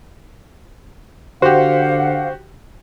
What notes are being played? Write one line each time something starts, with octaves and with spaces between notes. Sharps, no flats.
D3 F#4 G4 C5 F5 F#5